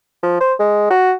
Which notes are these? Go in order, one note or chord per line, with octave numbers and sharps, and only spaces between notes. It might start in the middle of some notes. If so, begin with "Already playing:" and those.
F3
C5
G#3
F#4